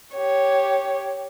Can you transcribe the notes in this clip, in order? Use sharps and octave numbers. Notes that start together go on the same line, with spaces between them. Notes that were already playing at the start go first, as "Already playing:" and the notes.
G4 C#5